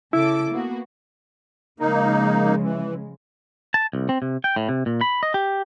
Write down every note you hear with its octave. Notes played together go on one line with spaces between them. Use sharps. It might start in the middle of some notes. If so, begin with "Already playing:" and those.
C#3 E4 A4 D6
A#3 B3 F#4
C#3 F3 G#3 A#3 D#4
E3
A5
C2
C4
C3
G5
A2
C3
A#2
B5
D#5
G4